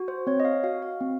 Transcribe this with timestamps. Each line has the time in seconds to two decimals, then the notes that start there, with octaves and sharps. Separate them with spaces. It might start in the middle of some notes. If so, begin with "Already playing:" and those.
Already playing: F#4
0.08 C5
0.27 C4 C#5
0.40 D#5
0.45 F5
0.64 F#4 F5
0.82 F5
1.01 C4